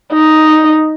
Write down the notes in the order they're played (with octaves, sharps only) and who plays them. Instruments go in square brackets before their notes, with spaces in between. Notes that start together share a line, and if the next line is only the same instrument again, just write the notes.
[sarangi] D#4